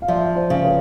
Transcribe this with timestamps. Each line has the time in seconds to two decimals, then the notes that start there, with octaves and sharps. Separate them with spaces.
0.02 F5
0.08 F3 D5 E5
0.35 C5 D5
0.50 C#3
0.64 B4 C#5